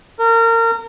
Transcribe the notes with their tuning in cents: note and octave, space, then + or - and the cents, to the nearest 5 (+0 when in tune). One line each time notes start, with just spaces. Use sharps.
A#4 -30